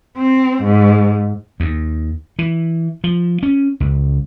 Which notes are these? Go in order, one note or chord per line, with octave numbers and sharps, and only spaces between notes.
C4
G#2
D#2
E3
F3
C#4
C#2